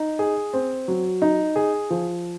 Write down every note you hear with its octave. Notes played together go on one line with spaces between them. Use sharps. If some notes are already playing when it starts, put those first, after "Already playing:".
Already playing: D#4
G#4
C4
F#3
D#4
G#4
F3